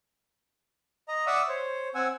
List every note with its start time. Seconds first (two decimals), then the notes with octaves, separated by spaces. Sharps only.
1.08 D#5 A#5
1.27 D5 E5 F#5 C#6 D#6 E6
1.49 C5 C#5
1.95 C4 F#5 G#5 E6